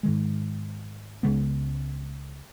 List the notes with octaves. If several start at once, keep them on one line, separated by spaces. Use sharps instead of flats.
G#2 D#3 G#3
C#2 C#3 G#3 B3